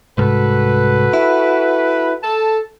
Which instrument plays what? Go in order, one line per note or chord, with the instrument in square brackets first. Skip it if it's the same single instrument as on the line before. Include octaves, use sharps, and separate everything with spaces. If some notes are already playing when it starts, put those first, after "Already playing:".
[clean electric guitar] C2 G#2 [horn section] F#4 A4 B4
[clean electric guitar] E4
[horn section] A4 A5